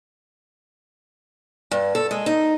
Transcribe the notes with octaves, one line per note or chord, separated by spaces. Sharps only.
G2
A4
G#3
D#4